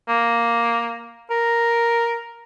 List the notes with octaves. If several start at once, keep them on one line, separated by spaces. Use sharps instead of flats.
A#3
A#4